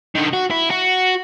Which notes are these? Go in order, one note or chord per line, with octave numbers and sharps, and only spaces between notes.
D3 D#3
F#4
E4
F#4